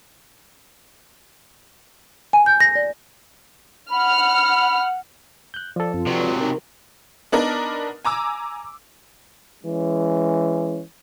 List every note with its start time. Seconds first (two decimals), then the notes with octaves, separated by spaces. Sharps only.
2.33 G#5
2.46 G6
2.61 A#6
2.75 D5
3.92 F#5 B5 F6
5.54 F#6 G6
5.76 F3 A4 D5
5.94 F#2 C4 F4
6.07 C3 F#3 B4 D5
6.40 D#4 A#4
7.32 B3 D4 D#4 A#4
8.05 G#5 A#5 D6 E6
9.64 E3 G#3 C#4